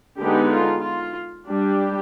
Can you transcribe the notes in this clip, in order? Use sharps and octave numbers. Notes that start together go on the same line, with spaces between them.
D3 G#3 B3 D#4 G4
F4
F4
G3 D4 G4